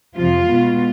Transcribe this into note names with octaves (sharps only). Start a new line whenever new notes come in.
F2 C3 F3 F4
B2 G#3 B3